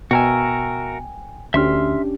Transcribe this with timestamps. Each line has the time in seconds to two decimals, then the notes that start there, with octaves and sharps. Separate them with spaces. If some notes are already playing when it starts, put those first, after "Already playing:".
0.11 B2 F#4 A#4 E5 G5 G#5
1.54 D2 C#4 D4 G4 E5 C6 F6